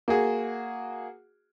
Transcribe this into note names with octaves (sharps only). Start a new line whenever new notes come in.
A#3 F#4 G#4